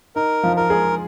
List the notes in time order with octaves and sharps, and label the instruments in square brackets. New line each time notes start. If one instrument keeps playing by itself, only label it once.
[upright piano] D#4 [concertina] A#4
[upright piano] F3 F4
[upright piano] F4 [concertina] A#4
[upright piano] G#3 G#4